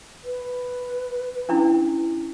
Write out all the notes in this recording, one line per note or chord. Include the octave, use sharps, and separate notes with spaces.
B4
C#4 D4 E4